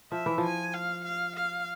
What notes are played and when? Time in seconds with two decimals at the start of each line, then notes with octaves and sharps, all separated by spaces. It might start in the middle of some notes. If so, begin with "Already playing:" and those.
0.12 F3 E5
0.26 E3
0.38 F3
0.44 G#5
0.74 F5
1.05 F5
1.36 F5